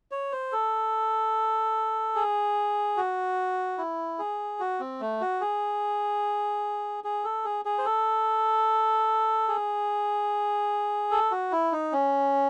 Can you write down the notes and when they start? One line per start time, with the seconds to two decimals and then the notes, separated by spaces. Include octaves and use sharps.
0.11 C#5
0.32 C5
0.52 A4
2.15 G#4
2.97 F#4
3.78 E4
4.19 G#4
4.60 F#4
4.80 C4
5.01 A3
5.21 F#4
5.41 G#4
7.04 G#4
7.24 A4
7.45 G#4
7.65 G#4
7.78 C5
7.86 A4
9.48 G#4
11.11 A4
11.31 F#4
11.52 E4
11.72 D#4
11.92 C#4